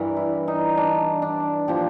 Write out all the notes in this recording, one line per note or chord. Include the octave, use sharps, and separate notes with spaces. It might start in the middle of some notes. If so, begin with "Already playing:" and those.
Already playing: G2 E3 G3 A#4
E4
D#4
D4
D4
A#2 F3 G4